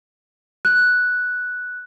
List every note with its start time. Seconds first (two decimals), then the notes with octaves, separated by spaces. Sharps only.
0.65 F#6